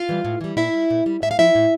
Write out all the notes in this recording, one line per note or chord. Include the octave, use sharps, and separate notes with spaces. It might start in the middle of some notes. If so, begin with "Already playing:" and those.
Already playing: F4 F5
E3 G3
A2
E3 G3
A#2 E4 E5
G3
A#2
G3
A2 E5
F5
F3 E4 E5
A2